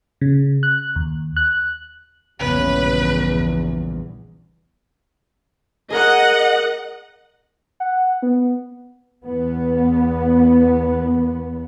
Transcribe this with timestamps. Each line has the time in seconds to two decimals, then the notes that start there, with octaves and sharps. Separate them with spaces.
0.21 C#3
0.63 F#6
0.96 D#2
1.37 F#6
2.40 A#1 E2 G2 C#3 E3 B4
5.90 G#4 A#4 D#5 F#5
7.80 F#5
8.22 B3
9.24 E2 B3